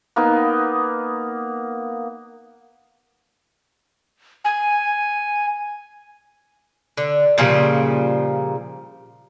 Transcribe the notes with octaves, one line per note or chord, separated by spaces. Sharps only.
A#3 B3 D#4
G#5
D3
A#2 C#3 F3 G3